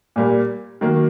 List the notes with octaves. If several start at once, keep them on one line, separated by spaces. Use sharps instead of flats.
A#2 G3 A#3
D#3 F#3 A#3